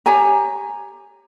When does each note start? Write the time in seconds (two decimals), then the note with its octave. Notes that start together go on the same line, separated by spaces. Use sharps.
0.06 G4 C#5 G#5 A#5